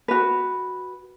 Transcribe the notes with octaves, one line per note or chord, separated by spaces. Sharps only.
F#4 B4